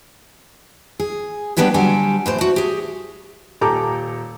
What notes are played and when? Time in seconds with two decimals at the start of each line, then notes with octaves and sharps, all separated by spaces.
1.00 G#4
1.57 G3 B3 D4 G4 B4 C#5
1.74 D3 F#3 G3 D4 G4 G#5
2.26 A2 E3 C5
2.38 D4 F#4
2.56 G4 G#4
3.61 D#1 G4 A4 A#5 D6